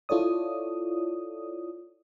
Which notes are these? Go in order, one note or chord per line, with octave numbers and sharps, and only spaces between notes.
E4 F4 A4 C#5 D5 D#6